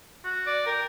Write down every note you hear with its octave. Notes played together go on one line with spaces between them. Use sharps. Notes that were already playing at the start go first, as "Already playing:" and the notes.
F#4
D5
A#4 G5